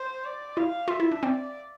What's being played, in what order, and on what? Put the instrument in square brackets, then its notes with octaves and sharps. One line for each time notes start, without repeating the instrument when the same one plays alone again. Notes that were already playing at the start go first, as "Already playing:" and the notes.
Already playing: [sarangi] C5
D5
[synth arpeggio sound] E4 [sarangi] F5
[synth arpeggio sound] F4 [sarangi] E5
[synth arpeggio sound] E4
D4
[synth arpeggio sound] C4 [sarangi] D5